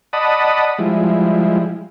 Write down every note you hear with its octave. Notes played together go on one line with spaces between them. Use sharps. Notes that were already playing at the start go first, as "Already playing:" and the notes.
D5 D#5 F#5 A5 B5 D#6
F3 G3 G#3 E4